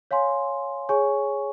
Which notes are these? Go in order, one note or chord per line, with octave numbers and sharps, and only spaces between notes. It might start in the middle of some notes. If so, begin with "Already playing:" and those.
C#5 F5 G#5 C6
G#4 C#5 G#5 C#6